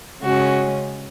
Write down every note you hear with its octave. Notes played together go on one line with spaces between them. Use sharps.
C#3 G#3 C#4 F#4